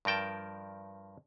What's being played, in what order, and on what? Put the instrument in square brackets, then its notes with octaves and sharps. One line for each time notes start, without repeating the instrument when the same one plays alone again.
[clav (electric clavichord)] G2 F3 A#4 G5 A5